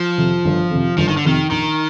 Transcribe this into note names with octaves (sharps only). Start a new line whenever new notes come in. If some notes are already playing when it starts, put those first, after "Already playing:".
Already playing: F3
F2 C3
G1
F2 C3
G1 F3
D#3
D3
F2 C3 D#3
A#1 D#3